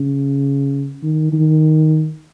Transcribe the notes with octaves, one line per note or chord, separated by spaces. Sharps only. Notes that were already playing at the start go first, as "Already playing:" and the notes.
Already playing: C#3
D#3
D#3